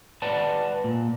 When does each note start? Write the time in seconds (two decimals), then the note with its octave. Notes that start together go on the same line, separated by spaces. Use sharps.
0.22 B4 D5 F#5 A5
0.84 A#2